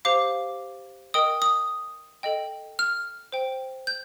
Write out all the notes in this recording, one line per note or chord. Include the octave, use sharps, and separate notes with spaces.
G4 C5 F5 D6
A#4 D#5 G5 D#6
D#6
A4 D#5 G5
F6
C5 G5
G6